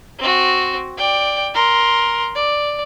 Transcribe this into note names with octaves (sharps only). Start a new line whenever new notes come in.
C4 F#4
D5 G5
A#4 C6
D5